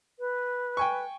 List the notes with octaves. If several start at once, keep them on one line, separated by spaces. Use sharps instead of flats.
B4
G5 G#5 C#6